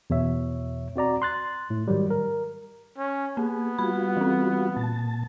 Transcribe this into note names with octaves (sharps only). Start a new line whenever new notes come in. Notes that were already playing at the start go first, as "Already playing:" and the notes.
E2 B2 C#5 E5
C4 F#4 D5 A#5
C6 F#6 A6
A2
G#2 D#3 F#3 G3
A#4
C#4
A#3 B3 G#4
G3 F4 F#4 B5
E3 C4
A#2 A5